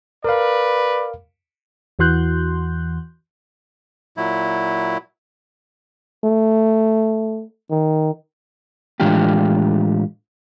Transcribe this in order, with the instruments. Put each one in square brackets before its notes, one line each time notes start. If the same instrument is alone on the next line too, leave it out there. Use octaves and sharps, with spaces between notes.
[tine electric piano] A#4 F5 [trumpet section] B4 D5
[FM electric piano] E2 E3 F#4 C6 F#6 G6
[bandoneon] A#2 F#3 E4
[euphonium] A3
D#3
[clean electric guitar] A2 E3 G#3 D4 F4 G4